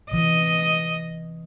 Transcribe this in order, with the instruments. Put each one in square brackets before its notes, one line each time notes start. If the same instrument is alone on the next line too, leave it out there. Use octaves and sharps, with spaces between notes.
[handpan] C3 E3 [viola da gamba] D#5